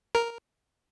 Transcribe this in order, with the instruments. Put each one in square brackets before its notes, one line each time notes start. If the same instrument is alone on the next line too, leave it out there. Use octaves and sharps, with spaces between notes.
[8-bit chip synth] A#4